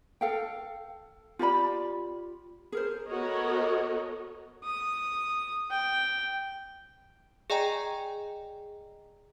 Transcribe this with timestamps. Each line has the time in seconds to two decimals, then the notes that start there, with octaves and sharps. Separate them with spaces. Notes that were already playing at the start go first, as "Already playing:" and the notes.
0.21 A4 F5 G5
1.39 F4 G4 D5 B5
2.72 G#4 A#4 C5
3.07 B3 F#4 A4 A#4 C#5 D#5
4.64 D#6
5.71 G5
7.50 G#4 D5 D#5 G5 G#5 A#5